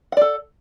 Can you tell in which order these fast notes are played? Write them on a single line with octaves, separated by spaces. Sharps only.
F#5 D5 A4